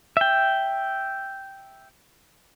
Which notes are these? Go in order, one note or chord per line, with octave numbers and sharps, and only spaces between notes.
E5 G5